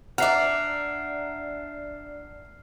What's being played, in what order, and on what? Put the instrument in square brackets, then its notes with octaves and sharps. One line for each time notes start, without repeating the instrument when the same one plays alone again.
[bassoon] D4 [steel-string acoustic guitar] D5 A#5 [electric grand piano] E5 F#5 [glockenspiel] F6 C7